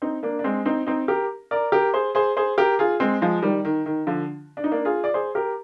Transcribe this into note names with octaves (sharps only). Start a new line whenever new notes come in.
C4 D#4
A#3 D4
D4
G#3 C4
C4 D#4
C4 D#4
G4 A#4
A#4 D5
G4 A#4
G#4 C5
G#4 C5
G#4 C5
G4 A#4
F4 G#4
G#3 C4
F3 G#3
D#3 G3
D#3
D#3
D3 F3
D4
D#4
A#3 D4
F4 G#4
D5
G#4 C5
G4 A#4